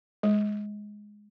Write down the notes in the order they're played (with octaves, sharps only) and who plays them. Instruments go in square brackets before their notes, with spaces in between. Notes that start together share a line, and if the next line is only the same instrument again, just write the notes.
[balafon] G#3